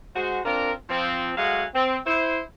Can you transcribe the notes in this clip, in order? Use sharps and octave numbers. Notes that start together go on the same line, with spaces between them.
G#3 F#4 C5
C4 D4 F4 A#4
F3 C4
F#3 G#3 A3 F5 F#5 G#5
C4
E4 C5